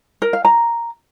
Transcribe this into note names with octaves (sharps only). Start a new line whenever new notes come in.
A#4
F5
A#5